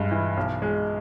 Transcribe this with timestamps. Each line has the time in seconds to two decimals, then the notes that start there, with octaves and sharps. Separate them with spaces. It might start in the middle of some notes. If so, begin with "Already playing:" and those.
Already playing: G2 G#3
0.11 E3
0.37 B1
0.62 G#3